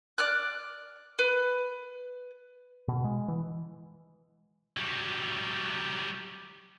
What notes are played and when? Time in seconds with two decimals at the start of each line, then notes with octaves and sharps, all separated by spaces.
0.18 D5 F6 F#6
1.19 B4
2.88 B2
3.04 G#3
3.28 E3
4.77 F#3 G3